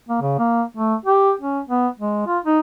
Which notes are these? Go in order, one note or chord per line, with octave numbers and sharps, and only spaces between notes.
A#3
C#3
A#3
A3
G4
C#4
B3
G#3
F4
D#4